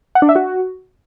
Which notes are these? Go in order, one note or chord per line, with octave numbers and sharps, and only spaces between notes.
F#5
D4
E5
F#4